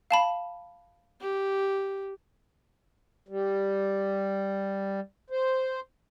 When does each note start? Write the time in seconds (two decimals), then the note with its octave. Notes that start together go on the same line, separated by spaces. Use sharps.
0.11 F5 A5 B5
1.21 G4
3.28 G3
5.30 C5